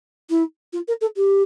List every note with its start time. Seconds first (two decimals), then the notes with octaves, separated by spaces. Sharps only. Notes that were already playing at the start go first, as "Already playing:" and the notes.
0.30 E4
0.73 F4
0.88 A#4
1.01 A4
1.16 G4